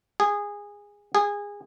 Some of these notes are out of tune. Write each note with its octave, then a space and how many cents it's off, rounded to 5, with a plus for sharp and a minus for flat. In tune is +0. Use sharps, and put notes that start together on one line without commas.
G#4 -15
G#4 -20